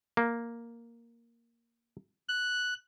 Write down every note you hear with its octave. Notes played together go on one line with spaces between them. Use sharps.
A#3
F#6